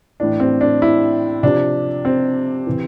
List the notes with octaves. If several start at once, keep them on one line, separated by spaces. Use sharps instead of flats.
A2 E3 D4
C4
D4
E4
C3 F3 D4
C4
C3 E3